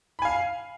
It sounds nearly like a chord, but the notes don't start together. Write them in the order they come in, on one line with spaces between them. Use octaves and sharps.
B5 G#5 F5